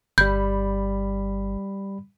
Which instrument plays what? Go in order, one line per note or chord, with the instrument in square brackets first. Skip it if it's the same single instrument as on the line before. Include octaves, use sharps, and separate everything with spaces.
[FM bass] G1 [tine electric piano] G3 B5 [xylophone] G6